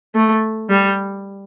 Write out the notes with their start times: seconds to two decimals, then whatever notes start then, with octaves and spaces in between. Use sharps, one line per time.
0.15 A3
0.70 G3